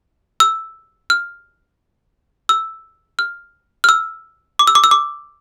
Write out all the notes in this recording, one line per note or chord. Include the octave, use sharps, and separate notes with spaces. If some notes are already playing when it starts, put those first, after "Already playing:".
E6
F6
E6
F6
F6
E6
D6
E6
D6
E6
D6